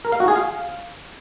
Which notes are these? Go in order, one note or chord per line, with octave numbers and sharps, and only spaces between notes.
A#4
F5
F#4
G#4
F5